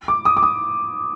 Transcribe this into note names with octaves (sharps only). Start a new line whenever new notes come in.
D6
D#6
D6
D#6